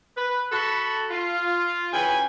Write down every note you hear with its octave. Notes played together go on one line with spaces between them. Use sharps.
B4
F#4 A4 A5 B5
F4
C#3 E3 F#4 G5 G#5 B5